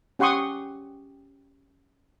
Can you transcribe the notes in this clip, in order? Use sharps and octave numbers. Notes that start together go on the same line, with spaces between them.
C#4 G4 F#5 C6 C#6 D#6